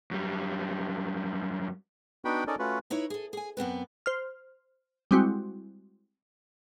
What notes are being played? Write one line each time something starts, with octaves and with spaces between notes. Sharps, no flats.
F#2 G3
B3 D4 D#4 F#4 G5 B5
C#4 D#4 A4 A#4 D5 D#5
A3 C#4 F4 F#4 B4
D#4 E4 B4 C#5
G#4 A4
G#4 G#5
F#2 B3 C4 B4
C5 F6
G3 G#3 C4 E4 F#4